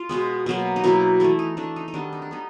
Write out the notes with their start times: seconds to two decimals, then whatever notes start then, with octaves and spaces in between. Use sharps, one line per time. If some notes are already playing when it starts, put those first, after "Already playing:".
Already playing: F4
0.09 B2 G#3 B3
0.46 B2 F#3 A#3
0.76 D#4
0.84 B2 F#3 A#3 E4
1.20 E3 A3 E4
1.39 D#4
1.57 E3 A3 D4
1.76 D#4
1.88 D#4
1.94 D#3 G3 B3 D4
2.12 D#4
2.22 D4
2.31 G3 B3 D#4